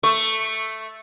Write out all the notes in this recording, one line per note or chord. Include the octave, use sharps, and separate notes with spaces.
A3 C#6